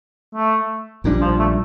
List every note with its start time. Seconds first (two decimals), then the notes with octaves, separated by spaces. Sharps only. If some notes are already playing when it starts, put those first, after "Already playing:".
0.35 A3
1.04 A#1 A#2 G3 D4
1.21 F3
1.39 A3